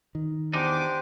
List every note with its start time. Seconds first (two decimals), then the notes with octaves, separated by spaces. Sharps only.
0.15 D#3
0.53 E2 D4 D#4 G4 C5 D6